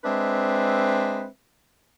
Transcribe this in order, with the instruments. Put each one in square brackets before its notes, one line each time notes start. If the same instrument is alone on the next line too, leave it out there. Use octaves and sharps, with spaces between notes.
[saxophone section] G#3 C4 D4 B4 E5